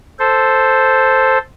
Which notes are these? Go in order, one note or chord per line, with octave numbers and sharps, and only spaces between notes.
A4 C5